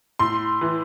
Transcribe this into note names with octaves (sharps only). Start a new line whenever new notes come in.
A2 C6
E3